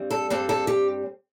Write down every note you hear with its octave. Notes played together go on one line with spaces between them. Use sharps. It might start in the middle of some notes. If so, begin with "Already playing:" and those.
Already playing: G2 G3 C4
A4
G2 G3 C4 A4
A4
G4